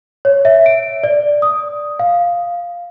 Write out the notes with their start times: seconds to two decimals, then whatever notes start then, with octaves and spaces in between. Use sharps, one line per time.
0.25 C#5
0.45 E5
0.66 D7
1.04 D5
1.42 D#6
1.99 F5